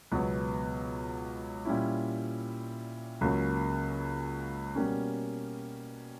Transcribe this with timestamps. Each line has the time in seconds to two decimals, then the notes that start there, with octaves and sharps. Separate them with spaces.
0.12 C#2 B2 F#3 B3
1.65 A#2 G3 C#4 E4
3.21 C#2 C#3 F#3 A#3
4.76 B2 G3 A#3 C#4